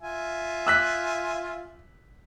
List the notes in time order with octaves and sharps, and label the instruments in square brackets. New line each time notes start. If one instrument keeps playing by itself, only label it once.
[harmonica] F4 E5 G#5
[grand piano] E6 F#6 B6